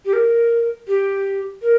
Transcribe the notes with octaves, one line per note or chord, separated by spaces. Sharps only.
G4
A#4
G4
A#4